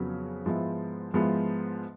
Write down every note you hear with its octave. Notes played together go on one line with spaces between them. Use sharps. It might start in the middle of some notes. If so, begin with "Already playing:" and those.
Already playing: F2 C#3 F#3 B3
G#2 F3 G#3 B3 E4
G#2 F3 G#3 B3 E4